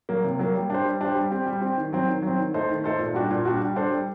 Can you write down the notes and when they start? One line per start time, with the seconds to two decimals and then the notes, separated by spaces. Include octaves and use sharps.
0.09 F#3 A#3
0.24 C3
0.39 F#3 A#3
0.54 G3
0.70 D4 G4 C5
0.85 G3
1.01 D4 G4 C5
1.15 G3
1.31 C4 G4
1.46 G3
1.61 C4 G4
1.77 D#3
1.93 F#3 C4
2.08 D#3
2.22 F#3 C4
2.38 D#3
2.54 A3 D#4 A4 C5
2.69 D#3
2.84 A3 D#4 A4 C5
2.99 A#2
3.14 G3 D4 F#4
3.31 A#2
3.45 G3 D4 F#4
3.60 G3
3.76 D4 A4 C5
3.91 G3